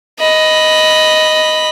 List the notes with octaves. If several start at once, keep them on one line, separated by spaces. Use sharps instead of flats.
D#5 B5